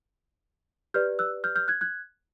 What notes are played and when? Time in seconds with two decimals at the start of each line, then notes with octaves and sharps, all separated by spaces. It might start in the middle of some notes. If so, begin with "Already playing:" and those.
0.94 G4 B4 D5 F6 G6
1.19 E6 F#6
1.44 F6 G6
1.56 F6 G6
1.68 F#6 G#6
1.81 F#6 G#6